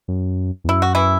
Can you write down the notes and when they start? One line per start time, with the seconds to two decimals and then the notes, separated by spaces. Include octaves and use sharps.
0.08 F#2
0.64 E2
0.69 F#2 E4
0.82 F#4
0.95 E3 E4